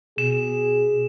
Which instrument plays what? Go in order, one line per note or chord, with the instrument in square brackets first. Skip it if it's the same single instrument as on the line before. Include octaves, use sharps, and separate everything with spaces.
[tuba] B2 [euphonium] G#4 [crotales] E7